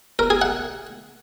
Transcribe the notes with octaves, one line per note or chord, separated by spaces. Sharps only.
A#4
G#4
F#5